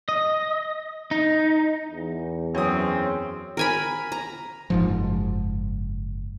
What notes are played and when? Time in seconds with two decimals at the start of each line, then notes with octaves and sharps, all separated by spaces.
0.09 D#5
1.11 D#4
1.91 E2
2.55 F#2 C4 C#4 D#6
3.57 A#4 G#5 B5
4.12 A#5
4.70 F#1 G#2 F3